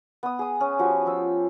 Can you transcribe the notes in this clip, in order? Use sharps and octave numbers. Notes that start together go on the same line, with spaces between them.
B3 D#6
G#4 D#6
C#4
F3 F#4 G4
F3 E6